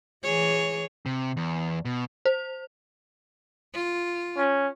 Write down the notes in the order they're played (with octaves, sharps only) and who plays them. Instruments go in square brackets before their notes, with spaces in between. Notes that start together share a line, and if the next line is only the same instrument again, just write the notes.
[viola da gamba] E3 G#4 C#5
[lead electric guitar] C3
E2
B2
[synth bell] C5
[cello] F4
[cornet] C#4